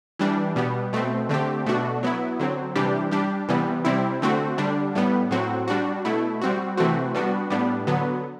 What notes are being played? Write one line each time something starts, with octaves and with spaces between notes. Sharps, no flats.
E3 G3 D4
B2 G3 B3
B2 A3 C4
D3 A3 C4 G4
B2 A3 D4 F#4
F#3 B3 E4
D3 F#3 C4
C3 E3 G3 D4 G4
G3 D4 G4
C3 E3 G3 B3
C3 G3 C4 E4
D3 A3 C4 F#4
D3 G3 D4
A2 G3 B3
A2 F#3 C4 F#4
G3 D4 F#4
B2 A3 E4
G3 C4 F#4
C3 E3 A3 C4 F#4
G3 B3 D4 F#4
A2 G3 B3 D4
D3 F#3 B3